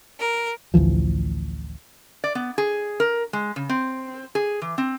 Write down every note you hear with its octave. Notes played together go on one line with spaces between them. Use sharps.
A#4
A1 D2 E3 F3
D5
B3
G#4
A#4
G#3
C#3
C4
G#4
E3
C4